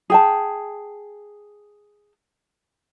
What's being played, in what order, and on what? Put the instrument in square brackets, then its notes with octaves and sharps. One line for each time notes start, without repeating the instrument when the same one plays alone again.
[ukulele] G#4 G5 A5